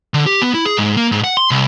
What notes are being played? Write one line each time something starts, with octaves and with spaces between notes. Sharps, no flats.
D3
G4
B3
E4
G#4
G#2
A#3
G#2
F#5
C6
C2